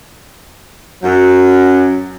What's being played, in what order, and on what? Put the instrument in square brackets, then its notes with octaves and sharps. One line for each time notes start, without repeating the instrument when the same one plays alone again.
[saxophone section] F#2 F#3